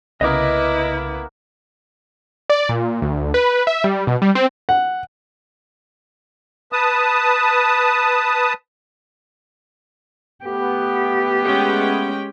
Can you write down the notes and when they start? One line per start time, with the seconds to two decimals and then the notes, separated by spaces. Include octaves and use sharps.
0.21 C2 C#3 A#3 B3 E4 B4 D#5 D6
2.50 D5
2.69 A#2
3.02 D2
3.34 B4
3.67 E5
3.84 G3
4.07 B2
4.22 G3
4.35 C4
4.69 F#5
6.72 B4 A5 D#6
10.45 A3 B3 G4
11.44 G#3 C#4 G5